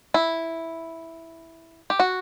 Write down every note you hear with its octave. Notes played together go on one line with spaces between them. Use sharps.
E4
G4
F#4